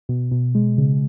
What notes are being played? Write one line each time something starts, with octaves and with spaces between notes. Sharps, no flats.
B2
B2
G#3
C#3